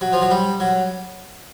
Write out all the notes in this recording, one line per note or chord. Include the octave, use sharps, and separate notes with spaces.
F#3
F3
F#3
G3
F#3